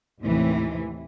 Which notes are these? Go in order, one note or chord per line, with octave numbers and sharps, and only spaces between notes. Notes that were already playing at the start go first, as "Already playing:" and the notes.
D#2 A2 C3 E3